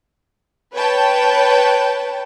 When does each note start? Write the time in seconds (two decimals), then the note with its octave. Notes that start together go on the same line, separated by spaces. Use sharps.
0.73 B4 C#5 G5 A5